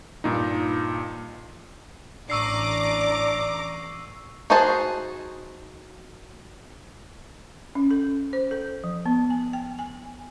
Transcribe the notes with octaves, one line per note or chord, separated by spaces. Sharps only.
G2 A#2 D#4
A1 A2 D4 A#5 C#6 D6 E6 C7
D#4 F#4 G#4 C5 A5
C#4
A4
C5
A4
F3
B3
G#5
G5
G#5